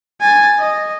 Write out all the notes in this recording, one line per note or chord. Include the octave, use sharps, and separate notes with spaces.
G#5 A6
D#5